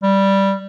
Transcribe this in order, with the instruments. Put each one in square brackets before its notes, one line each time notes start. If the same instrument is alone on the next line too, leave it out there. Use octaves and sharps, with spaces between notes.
[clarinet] G3